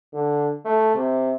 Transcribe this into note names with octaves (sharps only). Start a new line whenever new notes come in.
D3
A3
C3